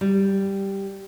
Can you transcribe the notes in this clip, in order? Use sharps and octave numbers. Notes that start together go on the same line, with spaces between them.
G3